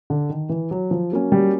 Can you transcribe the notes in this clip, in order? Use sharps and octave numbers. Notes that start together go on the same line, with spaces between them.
D3
D#3
E3
F#3
F3
F#3 A#3 C#4
G3